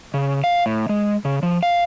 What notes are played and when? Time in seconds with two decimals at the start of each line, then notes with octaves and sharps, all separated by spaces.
0.14 C#3
0.44 F5
0.66 A2
0.89 G#3
1.25 C#3
1.43 F3
1.63 F5